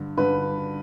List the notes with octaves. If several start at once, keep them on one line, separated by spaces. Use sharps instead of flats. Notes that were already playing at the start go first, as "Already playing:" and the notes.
Already playing: G2 D3
G2 D3 B4